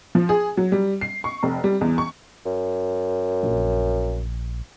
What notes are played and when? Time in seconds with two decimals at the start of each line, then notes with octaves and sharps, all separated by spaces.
0.15 F3
0.29 G#4
0.57 F#3
0.72 G3
1.01 C7
1.24 C#6
1.43 F1
1.64 G3
1.81 E2
1.98 C#6
2.45 F#2
3.43 A#1